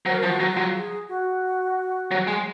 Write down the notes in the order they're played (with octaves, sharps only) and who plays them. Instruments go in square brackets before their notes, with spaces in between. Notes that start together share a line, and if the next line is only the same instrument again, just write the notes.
[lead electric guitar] F#3 [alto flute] C5
[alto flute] A#4
C5
[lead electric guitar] F3
[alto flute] F#4
[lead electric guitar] F#3
[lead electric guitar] F#3 [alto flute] F4
[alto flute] G#4
F#4
[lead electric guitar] F#3
G#3